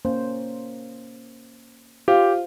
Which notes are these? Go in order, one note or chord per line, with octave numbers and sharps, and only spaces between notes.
A#3 C#4 C5
F4 G4 C5